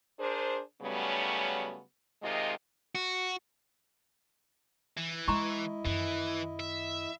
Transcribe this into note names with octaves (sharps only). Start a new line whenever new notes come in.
D4 G#4 A#4 C5
C#3 F#3 G3 A3 B3 C#4
C3 D#3 G#3 F4 D#5
F#4
E3
G#3 E4 D#5 A#5 C6 C#6
F#2 D#3 E3
E5